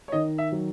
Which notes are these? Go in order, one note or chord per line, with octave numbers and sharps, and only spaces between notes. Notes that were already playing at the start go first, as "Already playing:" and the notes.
C#5
D#3 D#5
E5
F#3